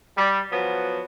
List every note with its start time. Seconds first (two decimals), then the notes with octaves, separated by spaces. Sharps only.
0.17 G3
0.51 F3 F#3 B3